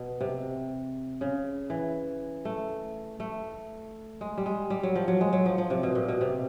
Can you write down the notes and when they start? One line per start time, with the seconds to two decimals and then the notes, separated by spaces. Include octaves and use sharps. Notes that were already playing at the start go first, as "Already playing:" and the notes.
Already playing: B2
0.21 C3
1.21 C#3
1.70 E3
2.45 A3
3.20 A3
4.21 G#3
4.37 G3
4.46 G#3
4.70 G3
4.83 F#3
4.95 F3
5.08 F#3
5.21 G#3
5.33 F#3
5.46 F3
5.58 F3
5.70 C3
5.83 B2
5.95 A#2
6.08 B2
6.21 C3